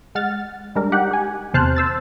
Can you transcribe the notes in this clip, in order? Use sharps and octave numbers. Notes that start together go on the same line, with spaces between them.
G#3 F#5 F6 A6
G3 G#3 D4 A#4
D#4 G4 F#5 F#6
G4 G#5
E2 C3 C5 A5 F6 F#6
C5 E6 A6